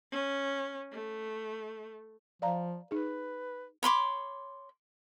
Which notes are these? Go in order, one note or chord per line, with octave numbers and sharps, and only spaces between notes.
C#4
A3
F3 D5 F5 A#5
D#4 G#4 B4
C#5 B5 C6 D6